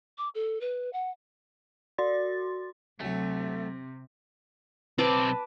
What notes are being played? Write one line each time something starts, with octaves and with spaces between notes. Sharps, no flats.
D6
A4
B4
F#5
F#4 D5 C6 A6
D2 C3 F#3 A3
B1 C4 B4 A5 D6